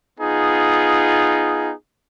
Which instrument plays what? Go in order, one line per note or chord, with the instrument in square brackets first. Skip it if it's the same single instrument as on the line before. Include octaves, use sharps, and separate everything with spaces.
[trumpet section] B3 D#4 F4 G#4